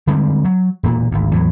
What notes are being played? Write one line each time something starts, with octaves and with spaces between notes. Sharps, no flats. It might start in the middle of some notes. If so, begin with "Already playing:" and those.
D3 G3 G#3 C4
F#3
E1 A#2 A3 A#3
G#1 D2
E2 A2 F#3